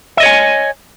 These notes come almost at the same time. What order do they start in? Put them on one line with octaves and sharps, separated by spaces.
E5 D#5 C#5 G#5